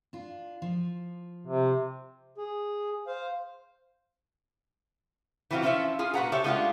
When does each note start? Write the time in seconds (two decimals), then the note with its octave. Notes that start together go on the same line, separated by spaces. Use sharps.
0.13 D4 F4
0.62 F3
1.47 C3
2.38 G#4
3.07 C5 F5
5.51 E3 F#3 C4 F4 F#4
5.62 F3 C#4 E4 F4 C5 E5
5.99 C#4 F4 G#4
6.14 A#2 F#4 B4 F#5 A#5
6.32 G4 A4 C5 C#5 E5
6.44 G#3 A3 D4 F4 G4 F#5